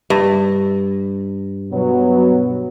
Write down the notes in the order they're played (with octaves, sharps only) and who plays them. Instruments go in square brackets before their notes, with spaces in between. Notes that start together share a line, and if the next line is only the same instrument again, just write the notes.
[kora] G2
[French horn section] B2 F#3 B3